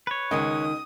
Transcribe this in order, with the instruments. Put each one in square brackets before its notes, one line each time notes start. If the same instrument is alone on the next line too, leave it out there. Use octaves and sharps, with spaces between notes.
[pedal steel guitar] B4 C#5
[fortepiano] C#2 [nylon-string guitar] D#3 [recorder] D#6